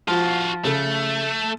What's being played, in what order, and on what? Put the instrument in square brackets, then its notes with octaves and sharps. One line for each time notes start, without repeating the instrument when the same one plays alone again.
[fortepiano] F3 [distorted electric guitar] F4 F#4
[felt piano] C#3 A4 [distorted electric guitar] A3